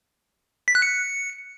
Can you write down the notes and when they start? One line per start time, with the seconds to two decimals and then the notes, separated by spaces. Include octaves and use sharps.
0.68 B6
0.75 F#6
0.82 C#7